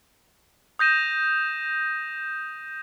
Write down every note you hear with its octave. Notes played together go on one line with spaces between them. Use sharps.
D#6 G6 A#6 D#7 E7